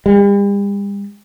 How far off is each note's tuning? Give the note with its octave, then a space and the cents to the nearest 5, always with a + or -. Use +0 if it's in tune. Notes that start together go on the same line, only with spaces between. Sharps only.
G3 +40